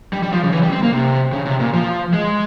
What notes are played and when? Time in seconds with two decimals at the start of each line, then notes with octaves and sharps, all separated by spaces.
0.13 G3
0.23 G3
0.33 F3
0.42 C#3
0.52 E3
0.63 G3
0.72 C4
0.83 A#3
0.92 C3
1.32 C#3
1.46 C3
1.60 A#2
1.73 F3
2.13 G#3